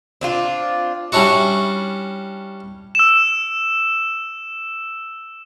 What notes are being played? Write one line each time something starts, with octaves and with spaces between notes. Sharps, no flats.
C4 D4 F4
G3 C#4 D4 E4 F#4
E6 E7